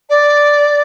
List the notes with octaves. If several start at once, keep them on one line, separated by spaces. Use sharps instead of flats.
D5